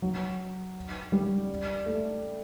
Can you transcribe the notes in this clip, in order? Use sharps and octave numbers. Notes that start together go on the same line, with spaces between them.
F#3
G3
A3